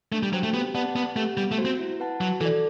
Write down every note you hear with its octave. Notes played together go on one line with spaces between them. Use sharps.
A3 D4
G3
F#3 F#4 C5 G5
A3
B3 G4
B3 D5 F#5 A5
B3 C4
A3 G4 B4 F#5
G3 B3
A3
F#4 C5
C4
E4
B4 F#5 A5
F#3 F#4
E3 A4 D5